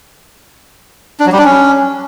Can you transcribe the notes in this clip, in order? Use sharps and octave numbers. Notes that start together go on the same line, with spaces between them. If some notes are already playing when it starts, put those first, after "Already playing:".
D4
F#3
G3
D4
C#4